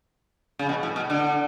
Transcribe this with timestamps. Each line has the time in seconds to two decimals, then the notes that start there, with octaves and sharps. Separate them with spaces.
0.59 C#3
0.69 B2
0.83 A2
0.96 B2
1.10 D3